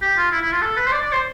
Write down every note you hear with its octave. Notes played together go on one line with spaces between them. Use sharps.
G4
F4
E4
E4
F4
A4
B4
C5
D5
D5
C5